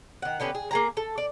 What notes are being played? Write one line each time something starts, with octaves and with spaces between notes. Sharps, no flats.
D#3 F#5
D3 B3 C#4 G4
G#4
A#3 G#4 A#5
A4
D5